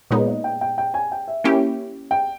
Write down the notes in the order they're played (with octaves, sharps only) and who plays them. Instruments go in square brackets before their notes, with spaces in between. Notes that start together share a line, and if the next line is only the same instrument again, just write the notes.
[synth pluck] A#2 G#3 B3 D#4 [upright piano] C#5
[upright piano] D#5
G5
G5
G5
G#5
G5
E5
[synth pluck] A#3 C#4 E4 G4
[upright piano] G5